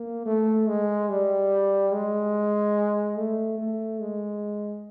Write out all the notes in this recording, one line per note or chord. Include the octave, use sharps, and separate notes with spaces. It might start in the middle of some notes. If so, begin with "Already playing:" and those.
Already playing: A#3
A3
G#3
G3
G#3
A3
A3
G#3